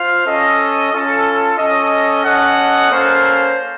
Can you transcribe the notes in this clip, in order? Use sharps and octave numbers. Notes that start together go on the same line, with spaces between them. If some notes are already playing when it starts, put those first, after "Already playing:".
Already playing: F4 C5 F5
C#4 A4 D#5
C#4 F4 A4
C#4 A4 D#5
C#4 A4 D#5 F#5
A#3 C#4 A4 C5 F5